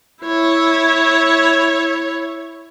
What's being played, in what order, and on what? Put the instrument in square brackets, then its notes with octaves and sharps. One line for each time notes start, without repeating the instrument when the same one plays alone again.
[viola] E4 C#5